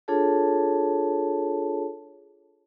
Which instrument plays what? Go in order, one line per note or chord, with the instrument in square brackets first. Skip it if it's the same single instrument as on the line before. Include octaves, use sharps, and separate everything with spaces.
[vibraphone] D4 F4 G#4 A4 C#5 A5